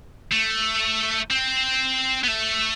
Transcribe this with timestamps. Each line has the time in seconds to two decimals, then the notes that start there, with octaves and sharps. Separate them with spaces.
0.32 A3
1.31 C4
2.24 B3
2.28 A3